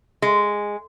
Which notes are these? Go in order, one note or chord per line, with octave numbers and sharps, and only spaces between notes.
G#3